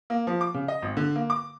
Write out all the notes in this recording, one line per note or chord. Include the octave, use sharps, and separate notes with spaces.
A#3
F3
D6
C#3
D#5
G#1
D3
A#3
D6